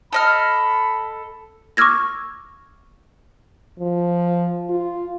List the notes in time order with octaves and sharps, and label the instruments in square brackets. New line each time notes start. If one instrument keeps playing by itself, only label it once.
[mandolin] A4 D#5 F6 [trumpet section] B5
[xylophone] C#6 D6 E6 F6 G#6 A#6
[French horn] F3
F4